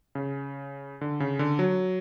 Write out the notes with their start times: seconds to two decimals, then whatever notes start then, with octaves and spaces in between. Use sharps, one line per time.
0.15 C#3
1.01 D3
1.20 C#3
1.39 D3
1.59 F#3